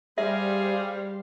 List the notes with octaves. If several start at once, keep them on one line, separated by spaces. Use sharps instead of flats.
G3 G4 G#4 C5 E5 F5